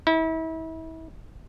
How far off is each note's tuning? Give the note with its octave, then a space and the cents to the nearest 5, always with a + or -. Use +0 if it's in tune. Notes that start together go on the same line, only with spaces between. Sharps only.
E4 -35